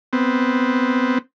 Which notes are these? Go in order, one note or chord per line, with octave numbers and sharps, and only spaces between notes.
B3 C4